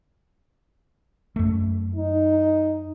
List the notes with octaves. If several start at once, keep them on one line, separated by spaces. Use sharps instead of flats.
F#2 A3
D#4